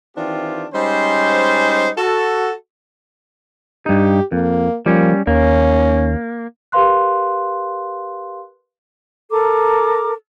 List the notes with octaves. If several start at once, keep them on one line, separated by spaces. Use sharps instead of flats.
D#3 E3 C4 D4 F4 G4
G3 G#3 C#4 D#4 C5
F#4 A4
G2 D#4 G4
F2 A#3
F3 G3 A#3 C#4
D#2 A#3 C#4
G4 A#4 B4 F5 C6 F#6
A4 A#4 A#5 D6